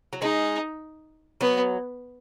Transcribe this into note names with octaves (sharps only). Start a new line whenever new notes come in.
F#3
G#3 D#4
F#3 B3